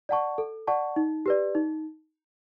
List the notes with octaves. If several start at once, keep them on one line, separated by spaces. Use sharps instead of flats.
D5 F#5 A5 C#6
A4
D5 F#5 A5 C#6
D#4
G4 B4 D5
D#4